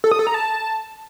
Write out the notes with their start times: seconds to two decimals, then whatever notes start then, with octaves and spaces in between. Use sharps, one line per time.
0.04 A4
0.11 D#6
0.19 A4
0.27 A#5
0.34 A5